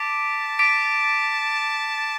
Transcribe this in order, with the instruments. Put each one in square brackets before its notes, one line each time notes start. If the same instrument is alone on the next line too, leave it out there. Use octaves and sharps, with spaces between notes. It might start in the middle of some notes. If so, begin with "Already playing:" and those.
Already playing: [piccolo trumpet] A5 [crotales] D6 B6 D7
[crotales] D6 B6 D7